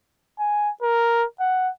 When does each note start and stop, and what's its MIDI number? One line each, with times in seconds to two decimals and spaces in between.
0.39 0.70 80
0.83 1.25 70
1.40 1.70 78